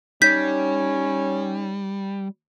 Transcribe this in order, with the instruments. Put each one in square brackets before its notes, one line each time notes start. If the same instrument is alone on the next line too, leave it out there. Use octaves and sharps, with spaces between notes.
[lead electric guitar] G3 [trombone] C#4 [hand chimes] D#4 C#5 G#6 [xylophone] G6 B6